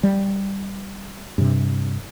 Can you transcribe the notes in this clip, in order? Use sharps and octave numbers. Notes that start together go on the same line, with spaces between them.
G3
G2 C3